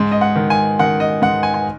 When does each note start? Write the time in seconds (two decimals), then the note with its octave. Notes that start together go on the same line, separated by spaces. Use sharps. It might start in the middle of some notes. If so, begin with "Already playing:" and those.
Already playing: G#2
0.11 D#5
0.21 F#5
0.36 D#3
0.50 G#5
0.79 D#3 F#5
1.00 D#5
1.22 G#2 F#5
1.43 G#5
1.54 G#5